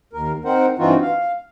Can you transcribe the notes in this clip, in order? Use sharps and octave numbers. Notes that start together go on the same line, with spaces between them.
D#2 A#4
C4 D#4 A#4 C5 F#5
G2 E3 C4 D#4 F4 F#4
F5